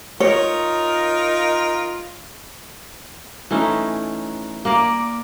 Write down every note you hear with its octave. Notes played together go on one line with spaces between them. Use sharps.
D#4 F4 A#4 C#5
E3 A3 C#4 D#4
A#3 A#4 D5